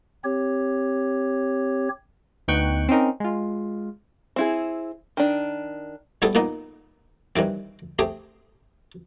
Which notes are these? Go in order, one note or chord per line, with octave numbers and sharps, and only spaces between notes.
C4 G4 C#5
D2 B3 D#4 G5 C#6 F#6
C4 C#4 D#4 A#4
G#3 F4
C4 E4 G#4
D#3 D4
G3 A3 B3 E4 G#4 A4
A#2 A#3 B3 D#4
G2 D#3 E3 C4
A3 C4 G4 G#4